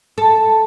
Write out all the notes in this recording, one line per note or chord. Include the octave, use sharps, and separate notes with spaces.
A4